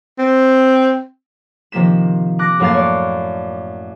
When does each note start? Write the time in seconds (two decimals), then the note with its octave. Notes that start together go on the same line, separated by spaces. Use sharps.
0.19 C4
1.72 C3 D#3 F3 A#3 B6 E7
2.39 D6 F#6 A#6
2.60 F#2 A2 A#3 F5 F#6 A6
2.74 C#5 D5